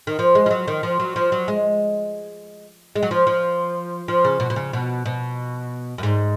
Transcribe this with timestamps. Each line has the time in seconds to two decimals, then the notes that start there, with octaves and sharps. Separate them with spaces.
0.07 D#3
0.19 F3
0.35 G#3
0.46 F3
0.51 F#3
0.68 D#3
0.83 F3
1.00 F#3
1.16 F3
1.32 F#3
1.48 G#3
2.96 G#3
3.03 F#3
3.11 F3
3.27 F3
4.08 F3
4.25 C#3
4.40 B2
4.50 B2
4.56 C#3
4.73 B2
5.06 B2
5.98 F#2
6.03 G#2